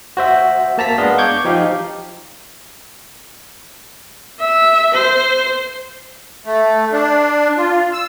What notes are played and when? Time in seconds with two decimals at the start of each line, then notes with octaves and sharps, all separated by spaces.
0.17 F#4 C5 E5
0.78 A#3 A5 A#5 B6
0.98 G#3 B3 D4 D#5 F5
1.18 C#6 D6 G6 G#6
1.45 F3 D#4 G4 F5
4.39 E5
4.93 C5
6.46 A3
6.93 D4
7.57 F4
7.93 E6